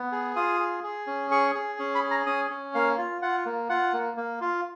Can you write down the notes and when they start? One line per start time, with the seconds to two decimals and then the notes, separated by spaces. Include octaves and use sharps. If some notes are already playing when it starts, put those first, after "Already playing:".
Already playing: B3
0.12 G#4
0.36 F4 D#6
0.60 G#4
0.84 G#4
1.07 C#4
1.31 G#4 C#6
1.55 G#4
1.79 C#4
1.95 B5
2.03 G#4
2.11 A#5
2.26 C#4 D#6
2.50 C#4
2.74 A#3 F5
2.98 F4
3.22 F4 F#5
3.46 A#3
3.69 F4 F#5
3.93 A#3
4.17 A#3
4.41 F4